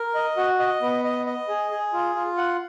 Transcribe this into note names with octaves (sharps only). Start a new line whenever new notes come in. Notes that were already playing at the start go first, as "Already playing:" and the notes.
Already playing: A#4
D#5
F#4
D#5
B3
D#5
D#5
G#4
G#4
F4
F4
F#5